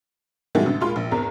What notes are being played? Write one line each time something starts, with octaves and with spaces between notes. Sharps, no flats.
A2 E3 G3 G#3 D#4 F#4
A1 D3
D#2 A#2 G#3 F4 B5 C6
A#1
G#1 E2 A#5